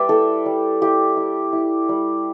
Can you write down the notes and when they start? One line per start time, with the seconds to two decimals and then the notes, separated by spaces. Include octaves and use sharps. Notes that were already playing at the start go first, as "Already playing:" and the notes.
Already playing: G3 B4 D5 E5 G5
0.09 E4 A4
0.46 G3
0.82 E4 G4
1.17 E4
1.53 E4
1.89 G3